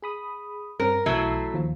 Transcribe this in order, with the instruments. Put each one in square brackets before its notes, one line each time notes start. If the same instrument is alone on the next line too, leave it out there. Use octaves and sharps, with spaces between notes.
[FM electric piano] G#4 B5 D#6
[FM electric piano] G2 C4 C#4 [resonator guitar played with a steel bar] A#4
[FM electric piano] B1 E3 C7 [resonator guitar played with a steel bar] F#3 A3 E4
[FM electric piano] D#2 F3 F4